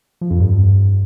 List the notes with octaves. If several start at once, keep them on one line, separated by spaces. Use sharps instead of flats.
F3
F2
G2